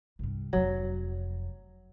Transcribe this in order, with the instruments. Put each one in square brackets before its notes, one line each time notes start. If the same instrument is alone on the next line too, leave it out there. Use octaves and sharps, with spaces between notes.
[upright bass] C2 G2
[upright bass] F1 F2 [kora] F#3